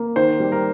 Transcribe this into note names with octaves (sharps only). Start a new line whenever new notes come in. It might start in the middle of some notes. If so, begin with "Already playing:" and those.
Already playing: A#3
D#3 C5
G3
A#4